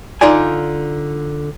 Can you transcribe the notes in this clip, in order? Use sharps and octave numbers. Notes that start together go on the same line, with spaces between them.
D3 D#4 F4 D5 G#5